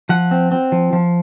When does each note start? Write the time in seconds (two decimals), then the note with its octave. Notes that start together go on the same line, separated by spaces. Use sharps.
0.09 F3 F#5
0.31 C4
0.52 C4
0.72 F3
0.93 F3